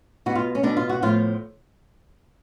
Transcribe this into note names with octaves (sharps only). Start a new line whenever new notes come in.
B2 F#4
F4
C#4
B2 D4
F4
F#4
A2 F3 F4